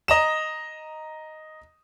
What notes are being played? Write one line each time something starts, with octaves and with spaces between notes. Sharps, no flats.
D#5 A#5 E7